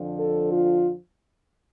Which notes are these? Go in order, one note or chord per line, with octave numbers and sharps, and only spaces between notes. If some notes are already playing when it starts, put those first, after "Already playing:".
Already playing: F2 D3 F3
A4
F4